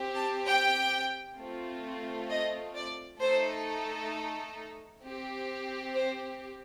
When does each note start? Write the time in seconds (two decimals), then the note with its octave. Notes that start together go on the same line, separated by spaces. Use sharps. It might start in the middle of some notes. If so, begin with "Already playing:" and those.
Already playing: C4 G4
0.16 A5
0.47 G5
1.38 A3 C4 F4
2.29 D#5
2.75 D5
3.21 A3 D#4 A4 C5
5.04 C4 G4
5.96 C5